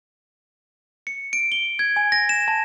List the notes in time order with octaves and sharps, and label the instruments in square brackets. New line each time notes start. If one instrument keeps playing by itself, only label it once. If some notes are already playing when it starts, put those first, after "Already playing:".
[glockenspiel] C#7
D7
G7
G#6
G#5
A#6
E7
A5